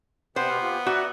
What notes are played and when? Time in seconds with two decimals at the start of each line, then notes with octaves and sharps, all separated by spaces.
0.36 C3 B3 C5 G5
0.50 B2 G4 F6
0.63 F4 G4
0.86 F#4 D5 E5 A#5